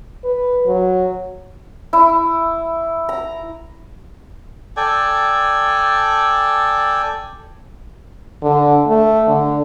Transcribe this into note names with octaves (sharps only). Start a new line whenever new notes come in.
B4
F#3
E4
A#5
A4 D5 G5 G#5
D3
A3
D3